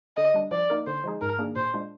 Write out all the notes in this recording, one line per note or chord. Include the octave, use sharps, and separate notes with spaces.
D3 D#5
G3 D4
F3 D5
A#3 D#4 A#4
D3 C5
F3 G#3 D#4 G#4
G#2 A#4
D#3 A#3 D4 G#4
A#2 C5
G#3 D4 F4 C5